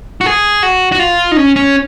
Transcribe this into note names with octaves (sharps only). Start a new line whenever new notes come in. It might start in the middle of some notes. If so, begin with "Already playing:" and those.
F#4
G#4
F#4
F#4
F4
D#4
C#4
C#4